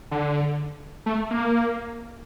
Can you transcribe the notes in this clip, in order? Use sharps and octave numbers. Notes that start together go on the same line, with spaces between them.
D3
A3
A#3